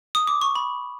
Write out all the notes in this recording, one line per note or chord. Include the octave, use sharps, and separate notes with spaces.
D#6
D6
C#6
B5